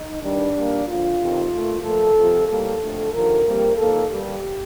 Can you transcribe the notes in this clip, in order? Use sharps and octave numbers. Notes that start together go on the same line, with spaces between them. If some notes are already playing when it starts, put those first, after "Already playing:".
Already playing: D#4
G2 D#3 G3 D4
A#2 G3 A#3
F2 D3 F3 F4
F2 C3 D#3
A#2 A3
A#2 F3 A3 A4
F2 C3 F3
A2 G3 A#3 A4
F2 D3 A3
D#2 D3 F3 A#4
F2 C3 G3 A#3
F2 D#3 A#3 A4
G2 D3 G3 A#3 G4